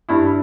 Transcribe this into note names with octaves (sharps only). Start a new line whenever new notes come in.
G2 E4